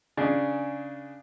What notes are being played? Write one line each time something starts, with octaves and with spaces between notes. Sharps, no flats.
C#3 D4 G#4